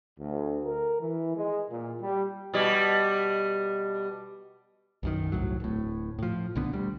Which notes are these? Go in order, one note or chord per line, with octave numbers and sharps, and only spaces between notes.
D2
A#4
E3
G#3
A#2
G3
B2 G3
B1 F#2 D#3
G1 C2 A2 F#3
D1 A2
A2 F3
B1 D3 B3
D2 G3